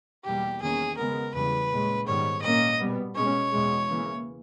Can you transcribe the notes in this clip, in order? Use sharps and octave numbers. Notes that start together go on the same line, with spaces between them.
E2 B2 G3 A#3 G4
E2 D#3 A#3 C#4 G#4
C#3 G#3 B3 A#4
E2 C#3 G3 B4
A#2 G#3 C#4
G#2 D#3 G3 B3 C#5
A#2 A#3 C#4 D#5
B2 G3 B3
B2 G#3 C#4 C#5
E2 B2 G#3
C#3 E3 A#3